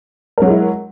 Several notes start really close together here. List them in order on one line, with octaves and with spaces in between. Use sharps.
A#4 F#3 G#3 E4